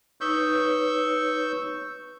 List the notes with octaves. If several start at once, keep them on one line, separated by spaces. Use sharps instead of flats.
D#4 B4 C#5 C#6 E6 G6